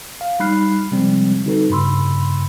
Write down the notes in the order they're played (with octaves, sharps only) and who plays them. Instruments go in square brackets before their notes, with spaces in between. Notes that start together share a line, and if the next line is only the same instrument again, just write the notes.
[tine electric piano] F5
G3 D#4 B5 F6 F#6 C7
C3 F3 G3 G#3 C4
D3 G3 D#4 F#4 A4 B4
G2 C#3 B5 C6 E6